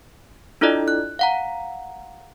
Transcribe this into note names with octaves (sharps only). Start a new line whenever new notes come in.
D4 E4 F4 A4 D5 D#5
F#6
F5 F#5 A#5